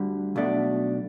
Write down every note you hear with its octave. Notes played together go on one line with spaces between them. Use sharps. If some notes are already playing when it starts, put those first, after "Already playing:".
Already playing: D2 D3 G3
B1 B2 A3 D4